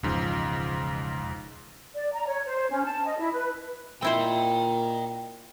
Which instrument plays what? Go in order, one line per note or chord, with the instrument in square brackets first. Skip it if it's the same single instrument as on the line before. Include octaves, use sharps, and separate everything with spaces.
[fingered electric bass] E1 C#3 [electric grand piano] C#2 G#2 F3
[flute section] D5
A#5
C#5
C5
C#4
A5
D#5
E4
B4
[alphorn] A#2 [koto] C4 E4 C5 [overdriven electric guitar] D#5 G5